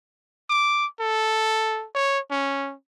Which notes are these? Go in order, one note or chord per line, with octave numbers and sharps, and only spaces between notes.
D6
A4
C#5
C#4